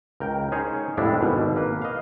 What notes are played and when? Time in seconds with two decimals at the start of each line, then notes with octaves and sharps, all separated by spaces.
0.20 C#2 A#4 G5
0.52 C#4 D#4 G#4 C5 C#5
0.97 F2 A2 G3 G#3 D4 E4
1.21 G#1 B2
1.56 A#3 B4
1.82 D#5 F5